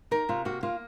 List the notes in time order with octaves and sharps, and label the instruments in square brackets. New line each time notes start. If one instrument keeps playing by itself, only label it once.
[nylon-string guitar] D#4 [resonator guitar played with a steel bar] A#4
[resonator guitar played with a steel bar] C3 [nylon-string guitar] F4
[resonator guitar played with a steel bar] A#3 [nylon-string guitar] F#4
[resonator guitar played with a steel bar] A#3 [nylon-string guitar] F4